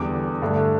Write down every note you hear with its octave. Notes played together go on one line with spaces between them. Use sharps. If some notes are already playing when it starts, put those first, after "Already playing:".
Already playing: E2 D3 G3 D6
G2 D3 A3